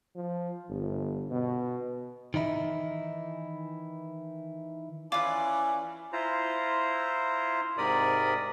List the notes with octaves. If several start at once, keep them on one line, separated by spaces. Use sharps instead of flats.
F3
G1
B2
D#3 E3 D#4 E4
E3 C#4 F4 B4 D5 G#5 D6
E4 F4 C5 A#5
G#2 C3 A#4 D5 B5 D#6